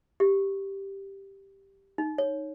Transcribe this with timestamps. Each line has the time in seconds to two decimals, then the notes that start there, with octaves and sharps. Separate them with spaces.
0.20 G4
1.98 D#4
2.18 C#5